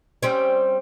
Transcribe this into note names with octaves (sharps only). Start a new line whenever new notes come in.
G3 C4 C#4